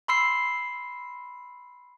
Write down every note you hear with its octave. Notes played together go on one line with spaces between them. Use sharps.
B5 C6 E6 C7